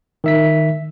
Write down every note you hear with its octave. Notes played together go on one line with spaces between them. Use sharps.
D#3 E5 B6